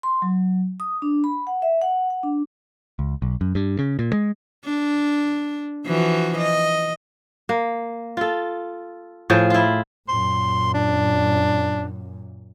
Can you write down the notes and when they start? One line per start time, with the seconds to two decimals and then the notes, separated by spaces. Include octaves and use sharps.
0.03 C6
0.22 F#3
0.80 D#6
1.02 D4
1.24 B5
1.47 F#5
1.62 E5
1.82 F#5
2.10 F#5
2.23 D4
2.99 C#2
3.22 B1
3.41 F#2
3.55 G2
3.79 C#3
3.99 A#2
4.13 G#3
4.65 D4
5.86 E3 F3 F#4
6.38 D#5
7.49 A#3
8.17 F4 A4
9.30 A2 F3 G#4
9.50 E4 F4
10.08 F#2 A#2 C6
10.74 D4